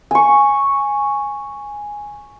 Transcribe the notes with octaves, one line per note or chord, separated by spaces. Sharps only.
G#5 C#6